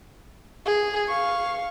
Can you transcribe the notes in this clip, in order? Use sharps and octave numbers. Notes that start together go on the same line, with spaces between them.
G#4
F5 C#6